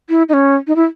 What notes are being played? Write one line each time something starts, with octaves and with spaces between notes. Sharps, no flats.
E4
D#4
C#4
D#4
E4